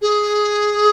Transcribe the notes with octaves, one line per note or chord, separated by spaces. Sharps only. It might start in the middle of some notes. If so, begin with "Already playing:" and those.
G#4